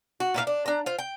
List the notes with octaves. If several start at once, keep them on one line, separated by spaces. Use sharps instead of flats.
F#4
A#2 E4 F#4 F5
D4
D4 A#5
F4 C5
G5